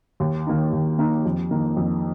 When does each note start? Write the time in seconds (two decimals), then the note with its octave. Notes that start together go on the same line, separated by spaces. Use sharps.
0.20 D#2
0.47 D#3 A#3 D#4
0.73 D#2
0.98 D#3 A#3 D#4
1.25 F2
1.51 D#3 A#3 D#4
1.77 F2